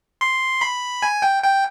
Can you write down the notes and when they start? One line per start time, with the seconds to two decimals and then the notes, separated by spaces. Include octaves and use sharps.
0.21 C6
0.61 B5
1.02 G#5
1.22 G5
1.43 G5